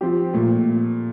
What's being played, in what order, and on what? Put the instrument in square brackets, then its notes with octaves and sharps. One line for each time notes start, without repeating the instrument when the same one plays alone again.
[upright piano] F3 C4 G4
A#2 F3 A3